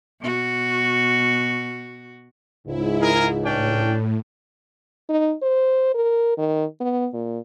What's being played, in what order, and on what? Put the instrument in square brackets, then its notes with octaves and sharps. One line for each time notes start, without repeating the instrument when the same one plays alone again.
[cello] B2 F#4
[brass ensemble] C#2 G#2 [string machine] E4
[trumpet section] G#4 A#4
[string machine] A2 [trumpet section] C#4 D4 G5
[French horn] D#4
C5
A#4
D#3
B3
A#2